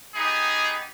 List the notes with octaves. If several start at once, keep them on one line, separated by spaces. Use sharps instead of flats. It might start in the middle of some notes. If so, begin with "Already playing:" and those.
B3 D#4 G4 G#4